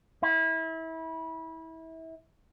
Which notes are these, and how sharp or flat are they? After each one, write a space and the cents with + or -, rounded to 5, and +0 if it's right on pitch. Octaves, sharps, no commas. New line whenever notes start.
E4 -25